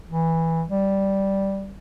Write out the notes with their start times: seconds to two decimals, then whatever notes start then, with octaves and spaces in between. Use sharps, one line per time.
0.09 E3
0.69 G3